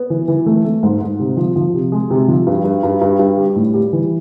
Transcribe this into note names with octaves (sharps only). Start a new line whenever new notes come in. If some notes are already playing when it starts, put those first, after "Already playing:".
Already playing: B3
E3
E3
A3
A3
G#2
G#2
C3
F3
F3
C3
G#3
C3
F3
G2
G2
G2
G2
G2
G3
A2
G3
E3